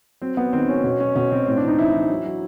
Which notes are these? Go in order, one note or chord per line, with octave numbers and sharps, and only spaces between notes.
F#3 C4
F#3 B3
D#3 C4
F#3 C#4
B2 C#4
F#3 C#4
B2 C#4
B2 C4
A2 C4
D4
E3
D#4
E3 E4
E3
F#3
F#3